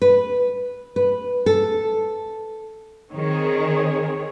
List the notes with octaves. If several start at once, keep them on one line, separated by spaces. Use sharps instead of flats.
B4
B4
A4
D#3 C4 G#4 C#5